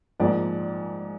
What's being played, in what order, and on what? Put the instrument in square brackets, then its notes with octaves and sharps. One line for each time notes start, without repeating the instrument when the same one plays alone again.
[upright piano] A#1 G#2 F3 A#3 D5